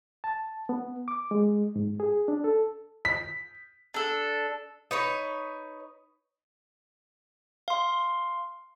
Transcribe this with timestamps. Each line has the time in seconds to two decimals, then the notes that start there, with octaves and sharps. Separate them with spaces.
0.24 A5
0.69 B3
1.08 D6
1.31 G#3
1.76 G#2
2.00 G#4
2.28 D4
2.44 A4
3.05 B6
3.94 D4 A4
4.91 D#4 B4 C#5
7.68 F5 C6